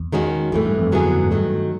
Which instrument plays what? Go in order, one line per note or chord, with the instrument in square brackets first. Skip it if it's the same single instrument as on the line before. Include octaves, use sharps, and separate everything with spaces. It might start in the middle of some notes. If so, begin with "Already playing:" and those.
Already playing: [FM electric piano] E2
[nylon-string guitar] D#3 G#3 C#4 F#4
[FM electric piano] F2 [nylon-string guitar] A2 E3 A3
[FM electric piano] G2
F2
[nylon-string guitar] D3 F#3 B3 E4 G#4
[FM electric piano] G#2
[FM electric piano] G2 [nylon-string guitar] D#3 F#3 A3